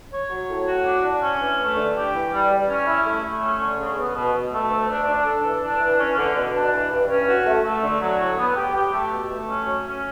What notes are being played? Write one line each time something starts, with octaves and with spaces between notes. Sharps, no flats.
C#5
F#3
A2
F#4
D4
D4
C#4
E3
A3
D3
G4
E3
G3
G3
C#4
E4
A3
A3
C#4
D3
C#3
B3
B2
B2
A3
D2
D4
D4
A4
E3
D4
E3
C#4
D3
B2
D4
E3
G2
C#4
F#4
A3
A3
D3
F#3
A2
B3
G4
G4
A3
B2
A3
C#4
F#3
C#4